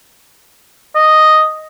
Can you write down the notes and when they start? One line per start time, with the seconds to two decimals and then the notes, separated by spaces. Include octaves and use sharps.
0.95 D#5